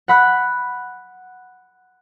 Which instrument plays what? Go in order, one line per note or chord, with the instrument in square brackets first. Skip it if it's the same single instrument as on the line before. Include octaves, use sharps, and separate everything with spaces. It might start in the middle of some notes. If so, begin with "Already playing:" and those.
[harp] F#5 B5 F#6